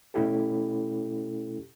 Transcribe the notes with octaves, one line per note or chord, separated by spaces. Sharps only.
B2 A3 C#4 E4 G4 A4